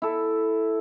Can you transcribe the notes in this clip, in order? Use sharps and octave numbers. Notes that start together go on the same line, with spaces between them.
E4 A4